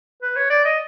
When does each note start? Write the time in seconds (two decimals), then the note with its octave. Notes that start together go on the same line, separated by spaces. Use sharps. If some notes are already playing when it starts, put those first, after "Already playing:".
0.22 B4
0.36 C#5
0.50 D5
0.65 D#5